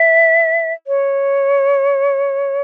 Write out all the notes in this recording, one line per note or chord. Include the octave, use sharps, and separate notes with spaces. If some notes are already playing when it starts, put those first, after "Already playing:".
Already playing: E5
C#5